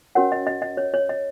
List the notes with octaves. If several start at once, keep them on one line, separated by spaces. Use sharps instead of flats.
C#4 F#4 A#4 C#5 F#5
D#5
D#5
D#5
C#5
C#5
D#5